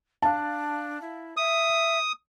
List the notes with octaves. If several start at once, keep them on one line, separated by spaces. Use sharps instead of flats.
D4 F5 A5
E4
E5 D#6